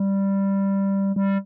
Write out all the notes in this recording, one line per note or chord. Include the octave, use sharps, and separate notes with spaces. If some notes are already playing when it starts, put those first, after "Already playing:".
Already playing: G3
G3